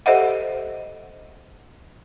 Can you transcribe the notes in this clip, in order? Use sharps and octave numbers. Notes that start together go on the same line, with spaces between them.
G4 A4 C5 D#5 E5 F#5